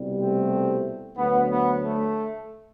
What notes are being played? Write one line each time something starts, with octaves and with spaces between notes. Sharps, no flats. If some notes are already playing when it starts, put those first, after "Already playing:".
Already playing: C2 B2 G3
A3 C4
D2 D3 F#3 B3
B3
A3